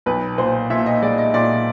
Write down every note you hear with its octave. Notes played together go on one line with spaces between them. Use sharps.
B1 B4
A#2 C5
A#2 E5
D#5
G#3 D5
D#5
A#2 D5